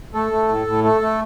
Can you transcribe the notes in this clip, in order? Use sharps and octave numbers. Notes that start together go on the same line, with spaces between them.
A3 A4
A3
A2
A2
A3 A4
A3